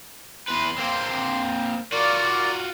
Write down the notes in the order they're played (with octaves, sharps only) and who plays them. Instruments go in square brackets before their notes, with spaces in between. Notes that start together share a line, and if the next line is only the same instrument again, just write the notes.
[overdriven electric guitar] E2 B4 [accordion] C6
[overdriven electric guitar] A#3 C4
[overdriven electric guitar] F4 F#4 [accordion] A#4 D5